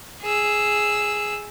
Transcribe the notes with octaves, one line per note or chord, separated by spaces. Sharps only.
G#4 E6